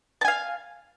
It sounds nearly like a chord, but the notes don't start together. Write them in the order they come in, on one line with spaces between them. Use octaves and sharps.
A5 G#5 F5